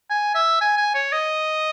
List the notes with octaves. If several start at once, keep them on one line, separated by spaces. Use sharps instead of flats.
G#5
E5
G#5
G#5
C#5
D#5